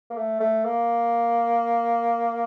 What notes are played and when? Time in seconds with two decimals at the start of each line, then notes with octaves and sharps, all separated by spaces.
0.10 A#3
0.17 A3
0.40 A3
0.65 A#3